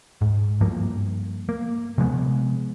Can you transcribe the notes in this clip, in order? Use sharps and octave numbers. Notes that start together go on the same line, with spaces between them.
G#2
G2 F3 A#3
A#3
C3 F3 G#3 B3